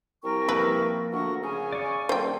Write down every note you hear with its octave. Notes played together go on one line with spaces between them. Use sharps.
C2 A#4 G5 C#6
F3 A#3 B4 E5
D2 A#4 F#5 C#6
C#3 G#5
D5 C#6
D#1 C5 G5